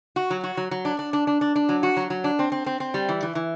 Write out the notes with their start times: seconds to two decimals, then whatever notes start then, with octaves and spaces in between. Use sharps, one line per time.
0.16 F#4
0.30 F#3
0.44 F#4
0.57 F#3
0.71 F#3
0.85 D4
0.99 D4
1.13 D4
1.27 D4
1.41 D4
1.56 D4
1.69 F#3
1.83 F#4
1.97 F#3
2.10 F#3
2.24 D4
2.39 C4
2.52 C4
2.66 C4
2.80 C4
2.94 G3
3.09 E3
3.23 E3
3.35 E3